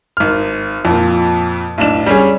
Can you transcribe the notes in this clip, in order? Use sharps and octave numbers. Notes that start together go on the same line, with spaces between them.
G#1 F6
F2 A#2
B1 A2 D4 E7
G3 C#4 G#4